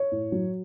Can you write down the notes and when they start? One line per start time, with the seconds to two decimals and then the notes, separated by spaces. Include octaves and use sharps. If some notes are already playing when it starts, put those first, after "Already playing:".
Already playing: C#5
0.12 A2
0.32 F#3